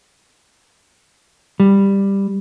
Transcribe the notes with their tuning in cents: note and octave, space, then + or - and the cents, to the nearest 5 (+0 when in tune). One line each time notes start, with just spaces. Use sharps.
G3 +10